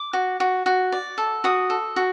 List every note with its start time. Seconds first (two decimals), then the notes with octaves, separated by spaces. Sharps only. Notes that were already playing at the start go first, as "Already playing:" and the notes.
Already playing: D6
0.13 F#4
0.40 F#4
0.66 F#4
0.92 D5
1.18 A4
1.44 F#4 D#6
1.70 A4
1.96 F#4